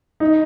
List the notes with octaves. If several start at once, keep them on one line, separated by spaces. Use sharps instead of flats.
D#4